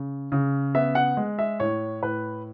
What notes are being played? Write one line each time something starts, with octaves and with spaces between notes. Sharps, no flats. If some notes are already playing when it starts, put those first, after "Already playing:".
Already playing: C#3
C#3
B3 E5
F#5
G#3
E5
A2 C#5
A2 B4